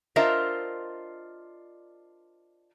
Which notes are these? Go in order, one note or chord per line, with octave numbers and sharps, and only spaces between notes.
D4 F4 A#4 C5 D#5 E5